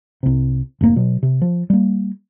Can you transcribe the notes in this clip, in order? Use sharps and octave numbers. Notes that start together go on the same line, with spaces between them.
C2 C3
F1 G#2 A#3
B2 F#3
C3
F3
G3 A#3